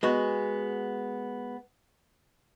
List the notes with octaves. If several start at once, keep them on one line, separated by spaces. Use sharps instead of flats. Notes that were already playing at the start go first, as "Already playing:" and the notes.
G#3 B3 F#4